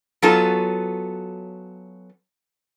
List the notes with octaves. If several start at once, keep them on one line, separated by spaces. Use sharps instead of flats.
F#3 B3 C#4 F4 A4